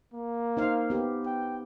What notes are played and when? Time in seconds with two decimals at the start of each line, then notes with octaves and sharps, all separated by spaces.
0.14 A#3
0.57 D#4 C5 F5
0.90 B3 G4
1.26 G5